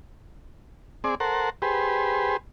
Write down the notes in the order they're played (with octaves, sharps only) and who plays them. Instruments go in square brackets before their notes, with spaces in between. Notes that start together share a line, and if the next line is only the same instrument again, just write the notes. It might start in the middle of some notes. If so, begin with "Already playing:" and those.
[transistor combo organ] C4 G#4 D5
A4 A#4 C5 F#5
G4 G#4 B4 C5